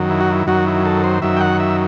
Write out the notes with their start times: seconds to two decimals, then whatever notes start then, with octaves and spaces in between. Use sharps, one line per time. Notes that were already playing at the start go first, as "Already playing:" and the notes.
Already playing: F#2 D#3 F#3
0.10 E4
0.20 F#4
0.32 E4
0.47 F#2 D#3 F#3 F#4
0.66 E4
0.85 A4
1.04 C5
1.22 F#2 D#3 F#3 E5
1.37 G5
1.41 F#5
1.60 E5